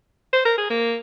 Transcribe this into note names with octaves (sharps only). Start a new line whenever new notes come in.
C5
A#4
G#4
A#3